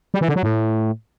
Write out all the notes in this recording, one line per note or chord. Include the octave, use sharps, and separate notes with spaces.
G3
E3
D3
F#3
A2